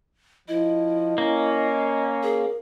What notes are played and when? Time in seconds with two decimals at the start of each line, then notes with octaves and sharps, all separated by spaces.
0.48 F3 E4 D#5
1.18 A#3 C#4
2.23 G#4 A#4